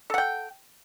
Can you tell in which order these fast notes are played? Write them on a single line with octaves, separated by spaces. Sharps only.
A4 F#5 G5